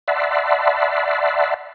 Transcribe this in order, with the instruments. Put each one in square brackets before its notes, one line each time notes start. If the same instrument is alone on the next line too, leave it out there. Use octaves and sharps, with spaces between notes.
[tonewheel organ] D5 E5 F#5 A5 B5 C6